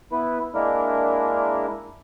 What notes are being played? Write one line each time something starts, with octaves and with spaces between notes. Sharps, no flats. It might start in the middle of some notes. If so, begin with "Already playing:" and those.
B3 E4 B4
G#3 A#3 D4 E4 A#4